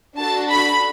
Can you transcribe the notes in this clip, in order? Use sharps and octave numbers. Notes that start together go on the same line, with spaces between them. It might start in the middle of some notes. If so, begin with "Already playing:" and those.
D4 F#4 A4 A5
B5